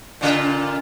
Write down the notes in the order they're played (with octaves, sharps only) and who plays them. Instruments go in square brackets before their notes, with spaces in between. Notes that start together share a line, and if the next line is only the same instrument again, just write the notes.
[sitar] A#2 C#3 F4